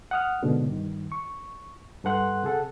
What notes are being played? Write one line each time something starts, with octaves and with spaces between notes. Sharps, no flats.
F#5 D#6 F6
G#2 B2 D3
G2 D#3
C#6
G2 A4 B4 F#5 C6 F#6
C3 G#4 A4 F#5